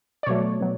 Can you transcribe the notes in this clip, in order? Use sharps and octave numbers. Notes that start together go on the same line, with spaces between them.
D5
B2 F#3 A3 C#5
B2 F#3